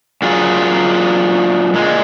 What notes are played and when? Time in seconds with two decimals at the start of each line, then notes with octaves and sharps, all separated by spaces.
0.22 A#2 F#3 F4 G#4
1.74 A#2 G#3